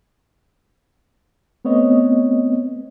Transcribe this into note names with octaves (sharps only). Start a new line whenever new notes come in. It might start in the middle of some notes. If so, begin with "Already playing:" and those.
A3 B3 C4 C#5 D#5